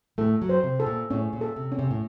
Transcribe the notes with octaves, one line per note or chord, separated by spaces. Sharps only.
A2 A3 A4
F#2 F#3
C5
C3
A4
A#2
A2 C#4
A#2
A4
C3
C#4
C3
A2